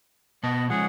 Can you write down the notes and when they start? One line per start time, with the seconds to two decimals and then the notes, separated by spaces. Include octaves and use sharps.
0.43 B2 B3 D#5 A5
0.70 F3 G#3 C#4 G#4 F#5